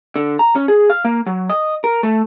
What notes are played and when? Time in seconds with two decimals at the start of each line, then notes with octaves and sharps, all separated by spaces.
0.16 D3
0.39 A#5
0.56 C#4
0.68 G#4
0.90 F5
1.05 A#3
1.27 F#3
1.50 D#5
1.84 A#4
2.03 A3